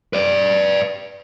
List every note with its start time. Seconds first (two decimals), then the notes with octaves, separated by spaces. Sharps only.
0.13 B4 D5